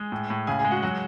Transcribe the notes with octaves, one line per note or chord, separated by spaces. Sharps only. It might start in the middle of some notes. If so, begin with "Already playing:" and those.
Already playing: G#3 G#4
A2
A2
C#3 G#4 G#5
G#4 G#5
G#3
F#4 F#5
F#3 F#4 F#5